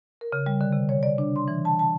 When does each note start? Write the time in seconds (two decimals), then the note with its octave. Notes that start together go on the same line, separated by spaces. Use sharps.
0.21 A#4
0.32 C#3
0.46 G3
0.61 D3
0.72 C3
0.89 C#5
1.03 D5
1.18 D4
1.36 C6
1.48 E3
1.65 A5
1.79 A5